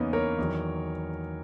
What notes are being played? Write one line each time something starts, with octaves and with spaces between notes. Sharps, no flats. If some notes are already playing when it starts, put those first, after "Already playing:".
Already playing: E2 C#3 E3 A#3 B3 C#4 D#4
A#4 C#5
E2 D#3 F#3